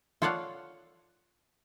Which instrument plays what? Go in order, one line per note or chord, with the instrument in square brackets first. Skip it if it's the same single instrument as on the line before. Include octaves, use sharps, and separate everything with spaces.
[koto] F4 A4 C#5 D5 F5 F#5